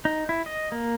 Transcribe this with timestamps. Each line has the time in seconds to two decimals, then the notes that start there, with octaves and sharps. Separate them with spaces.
0.05 D#4
0.29 E4
0.46 D#5
0.72 A#3